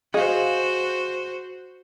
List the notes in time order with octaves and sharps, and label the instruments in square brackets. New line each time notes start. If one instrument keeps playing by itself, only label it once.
[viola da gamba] F#4 C5 [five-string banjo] G#4 [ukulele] D#5 F5